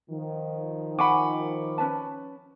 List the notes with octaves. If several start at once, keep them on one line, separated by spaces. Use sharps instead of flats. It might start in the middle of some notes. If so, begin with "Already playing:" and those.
D#3 F3
F#5 G#5 B5 C#6 D6
C#4 B4 A5